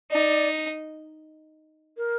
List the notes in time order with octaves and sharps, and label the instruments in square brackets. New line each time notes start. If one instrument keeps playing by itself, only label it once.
[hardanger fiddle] D#4 [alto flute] D5
[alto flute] A#4